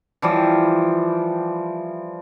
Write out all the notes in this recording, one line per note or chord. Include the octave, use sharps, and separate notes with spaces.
E3 F3 G3